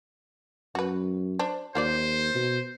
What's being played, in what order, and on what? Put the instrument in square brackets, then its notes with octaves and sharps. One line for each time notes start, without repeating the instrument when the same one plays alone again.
[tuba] F#2 [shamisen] F#4 B4
[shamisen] D4 C5
[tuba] D#2 [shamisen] A#3 F4 D5 [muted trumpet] C5
[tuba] B2